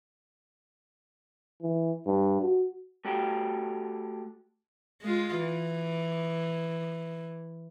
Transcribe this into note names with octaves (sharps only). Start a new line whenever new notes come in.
E3
G2
F#4
A3 F#4 G4
G#3 F4
E3